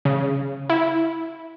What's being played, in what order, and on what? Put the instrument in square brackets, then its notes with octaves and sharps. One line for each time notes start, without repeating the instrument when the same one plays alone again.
[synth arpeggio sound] C#3
E4